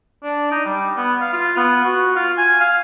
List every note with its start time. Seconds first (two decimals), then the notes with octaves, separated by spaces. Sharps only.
0.23 D4
0.51 D#4
0.65 G3
0.97 B3
1.21 F5
1.33 F4
1.57 B3
1.84 F#4
2.16 F4
2.38 G#5
2.61 F5